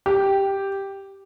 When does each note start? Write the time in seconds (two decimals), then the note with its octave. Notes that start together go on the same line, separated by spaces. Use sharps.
0.06 G4